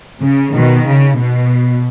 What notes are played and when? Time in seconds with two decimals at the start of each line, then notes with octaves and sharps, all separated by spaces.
0.22 C#3
0.54 B2 D#3
0.86 C#3
1.18 B2